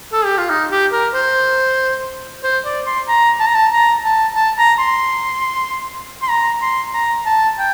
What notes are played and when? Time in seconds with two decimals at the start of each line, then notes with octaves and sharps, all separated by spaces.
0.13 A4
0.25 G4
0.37 F4
0.50 D#4
0.71 G4
0.92 A#4
1.14 C5
2.43 C5
2.65 D5
2.86 C6
3.08 A#5
3.40 A5
3.46 A#5
3.55 A5
3.72 A#5
4.05 A5
4.36 A5
4.58 A#5
4.79 C6
6.22 C6
6.29 A#5
6.62 C6
6.93 A#5
7.26 A5
7.58 G5